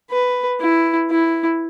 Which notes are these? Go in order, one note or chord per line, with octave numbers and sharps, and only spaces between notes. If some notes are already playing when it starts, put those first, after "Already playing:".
B4
E4
E4